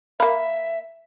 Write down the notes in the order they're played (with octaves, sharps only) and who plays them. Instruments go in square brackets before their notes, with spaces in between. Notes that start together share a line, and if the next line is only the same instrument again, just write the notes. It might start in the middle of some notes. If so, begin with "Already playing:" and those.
[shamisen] A#3 F5 [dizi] E5 [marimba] B5